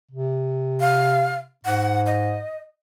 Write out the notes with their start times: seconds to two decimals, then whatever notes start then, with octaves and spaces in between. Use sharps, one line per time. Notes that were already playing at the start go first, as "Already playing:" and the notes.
0.11 C3
0.80 F5
1.65 G#2 F#5
2.06 D#5